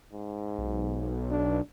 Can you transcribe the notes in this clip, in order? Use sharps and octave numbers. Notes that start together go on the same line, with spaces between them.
G#2
B1
D4